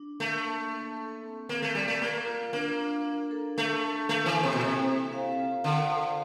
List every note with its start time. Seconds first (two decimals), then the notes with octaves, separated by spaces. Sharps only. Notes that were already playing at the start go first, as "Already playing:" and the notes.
Already playing: D4
0.20 A3 A#3
0.45 A#3
0.72 A#3
0.98 A4
1.23 C4
1.49 A#3 C4
1.62 A3
1.75 G3 D5
1.88 A3
2.02 A#3 A#4
2.27 F4
2.53 A#3 D4
2.79 D4
3.05 D4
3.31 A4
3.57 A3 D4
3.83 A4
4.09 A3 A#3
4.26 E3
4.35 E4
4.43 C3
4.53 A#2
4.61 C3 E5
4.87 A4
5.13 F5
5.39 F4
5.64 D3 F5
5.90 C5